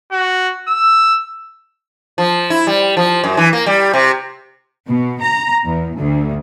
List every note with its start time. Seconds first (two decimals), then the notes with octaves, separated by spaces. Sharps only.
0.12 F#4
0.68 E6
2.18 F3
2.50 E4
2.67 G3
2.97 F3
3.24 F#2
3.37 E3
3.53 A#3
3.66 G3
3.94 C3
4.88 B2
5.21 A#5
5.65 E2
5.97 D2